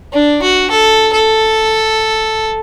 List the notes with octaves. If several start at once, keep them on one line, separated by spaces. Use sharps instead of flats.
D4
F#4
A4
A4